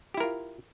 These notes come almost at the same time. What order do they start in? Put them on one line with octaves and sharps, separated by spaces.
G4 E4 A#4 F4